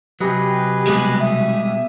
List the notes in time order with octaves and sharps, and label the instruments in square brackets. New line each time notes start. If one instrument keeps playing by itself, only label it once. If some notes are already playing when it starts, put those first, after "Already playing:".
[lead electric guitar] C3 F#3 [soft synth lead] G4 [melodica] G#4 B4 D#5
[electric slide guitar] B2 G3 G#3 [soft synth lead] F#6
[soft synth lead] E5 [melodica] D#6